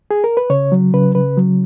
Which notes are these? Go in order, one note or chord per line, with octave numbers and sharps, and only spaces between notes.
G#4
A#4
B4
C#3 C#5
F#3
C#3 B4
C#3 B4
F#3